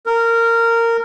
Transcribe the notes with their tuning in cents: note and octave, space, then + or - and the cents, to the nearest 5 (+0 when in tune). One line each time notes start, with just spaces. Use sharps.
A#4 -15